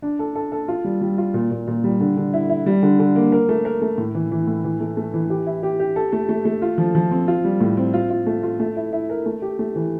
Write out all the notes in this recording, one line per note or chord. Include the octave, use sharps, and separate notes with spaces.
D4
A4
A4
A4
F4
G3
G3
F4
A#2
A#2
A#2
G3
D3
D3
E4
E4
G3
D3
D3
A#3
A#4
A3
A#4
A3
A2
E3
E3
A2
E3
A3
A3
E3
G4
E4
G4
G4
A4
A3
A3
A3
F4
F3
F3
C4
F4
G3
A2
C4
F4
F4
A3
F4
A3
E4
E4
A#4
A3
G4
A3
E3